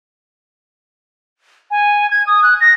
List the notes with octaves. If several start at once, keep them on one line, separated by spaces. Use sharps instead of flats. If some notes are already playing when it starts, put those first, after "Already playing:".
G#5
G#6
D#6
F#6
A#6